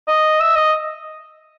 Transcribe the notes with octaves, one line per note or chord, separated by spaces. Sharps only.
D#5
E5
D#5